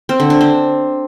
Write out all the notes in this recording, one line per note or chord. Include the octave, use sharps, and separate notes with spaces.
C4
D3
D4
C4